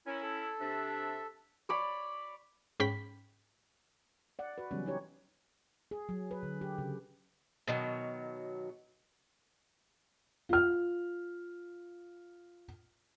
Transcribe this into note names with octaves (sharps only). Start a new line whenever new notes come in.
C#4 E4 A#4 G#5
A4
C3 D4 E5
C#5 D5 B5
G#2 C#4 G5 B5 B6
D5 F#5
F#4 B4
C#3 E3 F#3 G3 B3 C#4
D#4 G4 C#5
G#4
F#3
B4
D3
G4
C#3
B2 D#3 F#3
F4 F6